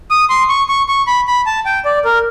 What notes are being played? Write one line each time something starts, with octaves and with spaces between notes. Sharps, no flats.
D#6
C6
C#6
C#6
C#6
B5
B5
A5
G5
D5
A#4